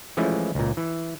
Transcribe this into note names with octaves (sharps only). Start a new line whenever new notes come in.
E3 F3 G#3 A3 C#4 E4
C#2 A#2
E3